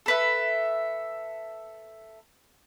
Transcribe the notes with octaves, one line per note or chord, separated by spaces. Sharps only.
A4 B4 E5